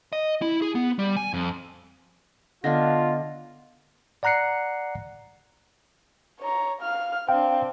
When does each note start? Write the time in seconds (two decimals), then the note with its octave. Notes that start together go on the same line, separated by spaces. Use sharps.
0.13 D#5
0.42 E4
0.62 G#4
0.75 B3
0.99 G3
1.17 G#5
1.34 F2
2.64 D3 B3 D4 F4 D#5 A#6
4.23 D5 F#5 A#5 F#6 C7 C#7
6.40 C#5 A#5
6.82 F5 F6
7.29 C4 D4 F5 G5